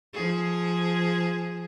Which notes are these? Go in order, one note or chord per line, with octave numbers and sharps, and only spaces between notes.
F3 G#4